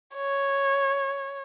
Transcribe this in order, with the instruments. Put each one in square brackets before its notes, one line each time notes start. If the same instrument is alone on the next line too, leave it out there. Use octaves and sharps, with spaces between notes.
[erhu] C#5